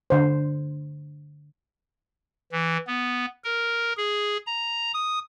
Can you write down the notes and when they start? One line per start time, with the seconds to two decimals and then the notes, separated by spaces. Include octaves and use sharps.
0.10 D3 C5
2.52 E3
2.87 B3
3.44 A#4
3.97 G#4
4.47 A#5
4.94 D#6